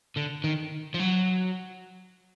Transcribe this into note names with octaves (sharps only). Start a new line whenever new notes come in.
D3
D#3
F3
F#3